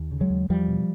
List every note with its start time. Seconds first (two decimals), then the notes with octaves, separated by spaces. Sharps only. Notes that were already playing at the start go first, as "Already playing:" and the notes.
Already playing: D#2
0.11 C#3
0.21 F#3 G#3
0.30 D#2
0.50 E2 F3 G3
0.68 B2